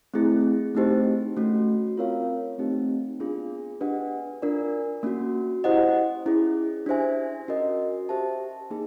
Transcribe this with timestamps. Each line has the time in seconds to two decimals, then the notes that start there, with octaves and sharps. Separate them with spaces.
0.14 A3 C4 E4 G#4
0.75 A3 C4 D#4 G4 C5
1.37 A3 C#4 F#4
1.97 C4 F4 A#4 C#5 F5
2.58 A3 C4 D#4 G4
3.19 B3 D4 F4 G#4
3.81 D4 G4 B4 D#5 F#5
4.42 D4 F4 A#4 D5
5.03 A#3 C#4 F#4
5.64 E4 G4 C5 D#5 F#5
6.26 C#4 E4 G#4
6.86 D4 G4 C5 E5 G#5
7.48 C#4 F#4 A#4 D#5
8.09 G4 C5 E5 A5
8.71 A#3 D#4 G#4